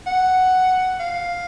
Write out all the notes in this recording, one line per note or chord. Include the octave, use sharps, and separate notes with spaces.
F#5
F5